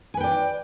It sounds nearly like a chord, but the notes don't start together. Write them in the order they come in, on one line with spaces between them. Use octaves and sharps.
G#5 B4 G5 D5